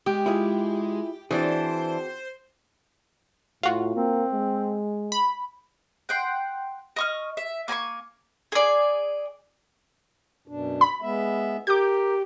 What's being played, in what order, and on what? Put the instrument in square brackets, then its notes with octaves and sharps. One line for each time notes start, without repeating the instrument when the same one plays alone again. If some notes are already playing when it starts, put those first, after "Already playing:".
[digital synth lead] G#3 [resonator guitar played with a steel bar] G4
[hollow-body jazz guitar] E4 F4 G#4
[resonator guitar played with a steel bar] E3 D4 [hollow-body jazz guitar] C4 F#4 G#4 [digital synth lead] C5
[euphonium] A2 [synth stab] F4 F#4
[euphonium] A#3 [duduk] C4
[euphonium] G#3
[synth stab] B5
[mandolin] F#5 G5 C6
D#5 C#6 F6
E5
A#3 G#5 B5 C#6
G#4 D5
[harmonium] F#2 B2 D4
[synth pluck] B5
[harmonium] G#3 B3 E5
[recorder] G4 [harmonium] A#4 [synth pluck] D6 G6